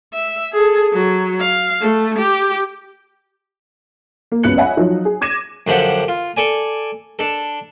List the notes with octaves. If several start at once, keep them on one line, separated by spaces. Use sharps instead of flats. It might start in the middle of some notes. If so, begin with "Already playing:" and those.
E5
G#4 A4
F#3
F5
A3
G4
A#3
C#2 F#2 B3 F#6 C#7 F#7
C#5 D#5 E5 F#5 G#5 B5
F3 F#3 D#4
G#4
D6 G#6 A#6 D#7 E7
F#2 D3 F3 G4 F#5
F4
A4 D5 G#5
D4 A4